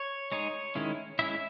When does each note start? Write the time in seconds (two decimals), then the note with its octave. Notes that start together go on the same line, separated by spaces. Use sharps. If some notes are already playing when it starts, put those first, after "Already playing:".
Already playing: C#5
0.32 G#3 D#4 C#5
0.75 D#3 G#3 C#4 E4
1.19 G#3 C#4 E4 E5